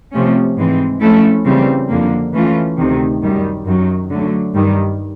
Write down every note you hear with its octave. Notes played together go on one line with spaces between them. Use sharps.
C3 F3 A3 C#4
G#2 E3 G#3 C4
F3 A3 C#4 E4 A4
C#3 E3 G3 C4
F2 D3 F3 A#3
E3 A3 C#4 F4
D2 C3 D#3
F#2 D#3 G3
F#2 D#3 F#3
D3 F#3 A3
G2 D#3 G3